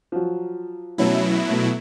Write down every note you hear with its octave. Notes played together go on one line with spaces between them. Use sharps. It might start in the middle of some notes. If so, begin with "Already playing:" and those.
F3 F#3
B2 F#3 A3 C#4 E4 A4
A3 B3